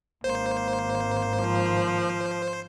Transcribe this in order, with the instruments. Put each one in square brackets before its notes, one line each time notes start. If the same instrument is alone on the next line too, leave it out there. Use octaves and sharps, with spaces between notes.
[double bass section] G#1 [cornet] A#3 [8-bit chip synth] C5
[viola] F3